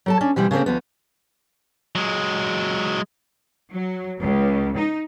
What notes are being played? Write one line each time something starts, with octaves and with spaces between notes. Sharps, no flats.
F#3 A4 A5
C#4 D4
B2 E3 G3 C4
C#3 A3 A#3 C4
D2 F3 B3
F#3 G#3
F#3
C#2
D#4